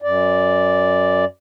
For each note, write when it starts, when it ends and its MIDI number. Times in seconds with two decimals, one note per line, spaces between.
0.02 1.25 42
0.02 1.25 74